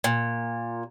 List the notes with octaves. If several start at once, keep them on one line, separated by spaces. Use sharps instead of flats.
A#2